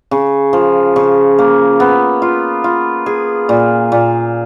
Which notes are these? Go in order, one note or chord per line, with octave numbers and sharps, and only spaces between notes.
C#3
F3
C#3
A#3
B3
F4
F4
G#4
A#2
A#2